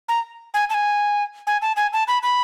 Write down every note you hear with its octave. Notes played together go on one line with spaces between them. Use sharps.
A#5
G#5
A5
G#5
G#5
A5
G#5
A5
B5
B5